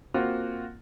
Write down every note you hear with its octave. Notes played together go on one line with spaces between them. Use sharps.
A#3 C4 F4 F#4